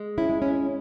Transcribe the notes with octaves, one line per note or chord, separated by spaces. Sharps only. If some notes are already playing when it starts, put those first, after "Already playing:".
Already playing: G#3
C#4 E4
G#3
C#4 E4